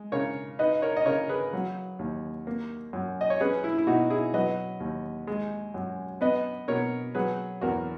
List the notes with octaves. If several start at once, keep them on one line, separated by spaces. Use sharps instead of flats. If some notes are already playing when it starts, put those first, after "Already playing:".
Already playing: G#3
C#3 A#4 C#5
D#4 B4 D#5
A#4 C#5
D#5
C#3 A#4 C#5
G#4 B4
F#3
D#2
A#3
F#2
D#5
C#5
C#4 G#4 B4
E4
E4
B2 D#4 F#4
E4 G#4
F#3 B4 D#5
D#2
G#3
F#2
B3 B4 D#5
B2 A#4 C#5
F#3 G#4 B4
E2 F#4 A#4